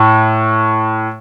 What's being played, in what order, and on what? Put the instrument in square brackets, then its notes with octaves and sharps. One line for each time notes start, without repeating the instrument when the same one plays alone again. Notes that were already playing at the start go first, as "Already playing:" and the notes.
Already playing: [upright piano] A2